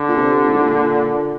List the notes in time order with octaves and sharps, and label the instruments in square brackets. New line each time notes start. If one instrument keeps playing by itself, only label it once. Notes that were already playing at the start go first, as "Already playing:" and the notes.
Already playing: [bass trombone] D3
[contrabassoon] A#2
C3
A#2
G#2
A#2